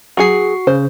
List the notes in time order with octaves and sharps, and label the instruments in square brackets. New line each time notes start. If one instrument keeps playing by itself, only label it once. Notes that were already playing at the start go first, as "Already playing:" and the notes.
[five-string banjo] F#3 G#4 [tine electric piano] F#4 C#6 C7
[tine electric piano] C#3 [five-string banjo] C5